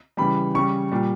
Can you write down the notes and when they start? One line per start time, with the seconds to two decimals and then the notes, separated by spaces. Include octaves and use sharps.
0.17 C#3 E3 G3 B5
0.55 C#3 G3 C#6
0.92 A#2 G3